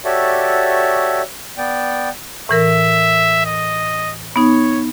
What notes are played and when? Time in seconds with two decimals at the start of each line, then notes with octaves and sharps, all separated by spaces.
0.05 F#4 G4 A4 C#5 D5 E5
1.58 B3 D5 G5
2.49 A2 E3 A#4 E5
3.46 D#5
4.36 B3 D#4 C#5